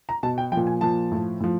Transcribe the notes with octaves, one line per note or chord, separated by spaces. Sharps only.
A#5
B2 A5
G5
F3 G5
A#2
G#5
A#2 F3 A5
A2 F3
A2 F3